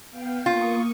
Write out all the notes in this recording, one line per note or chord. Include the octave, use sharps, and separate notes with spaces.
B3 F5 G5
A#3 F4 C#6 D#6